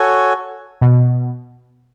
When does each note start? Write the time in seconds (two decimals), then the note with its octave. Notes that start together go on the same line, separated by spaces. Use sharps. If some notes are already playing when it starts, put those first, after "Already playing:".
Already playing: F#4 A4 C#5 G#5
0.81 B2